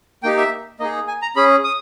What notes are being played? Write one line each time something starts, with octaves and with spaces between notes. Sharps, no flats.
A#3 D#4 G4 G5
E5
A#3 D#4 G#4 D#5
G#5
A#5
C#4 G#4 B5
D#6